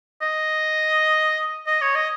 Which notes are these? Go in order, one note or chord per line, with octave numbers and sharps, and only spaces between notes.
D#5
D#5
C#5
D#5